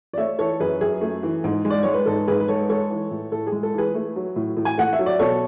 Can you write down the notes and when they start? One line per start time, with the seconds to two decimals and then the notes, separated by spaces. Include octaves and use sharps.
0.13 D5
0.18 A3 C#5 E5
0.39 E3 A4 C#5
0.60 F#2 G#4 B4
0.81 F#2 G#4
1.01 A3
1.23 E3
1.44 G#2
1.65 G#3
1.70 D5
1.83 G#3 C#5
1.94 B4
2.06 G#2 A4
2.28 G#2 G#4 B4
2.40 B4
2.48 G#3 A4 C#5
2.69 G#3 A4 C#5
2.90 E3
3.11 A2
3.32 A2 A4
3.47 G#4
3.52 G#3
3.63 A4
3.74 E3 G#4 B4
3.94 A3
4.16 F#3
4.36 A2
4.57 A2
4.65 G#5
4.78 A3 F#5
4.93 E5
4.99 F#3
5.06 D5
5.19 B2 A4 C#5